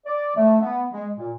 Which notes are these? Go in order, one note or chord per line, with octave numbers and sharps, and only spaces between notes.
D5
A3
B3
G#3
A#2